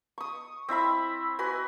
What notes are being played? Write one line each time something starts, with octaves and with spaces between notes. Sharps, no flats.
C#6 D#6
C4 E4 E5 B5
F#4 B4 G#5